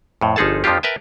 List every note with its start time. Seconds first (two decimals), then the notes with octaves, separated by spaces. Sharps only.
0.21 F2 A2
0.36 G1 F3 D#4 G#4 A4 A5
0.64 F2 F3 A#3 D4 F4 G4
0.83 A#4 B4 E5 G5 A5